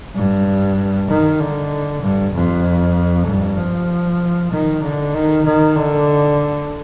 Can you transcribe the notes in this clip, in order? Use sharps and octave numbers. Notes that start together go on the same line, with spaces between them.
G2
D#3
D3
G2
F2
G2
F3
D#3
D3
D#3
D#3
D3